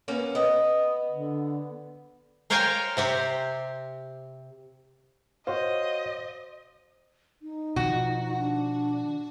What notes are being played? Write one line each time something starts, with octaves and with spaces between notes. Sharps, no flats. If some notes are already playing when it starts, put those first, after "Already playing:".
A#3 B3 C#4
B3 D#5
D3
A#4 C5 C#5 F5 G5 G#5
C3 C4 G4
F#4 C5 C#5 D#5 F5
D#4
B2 D#3 F3 F#4
D4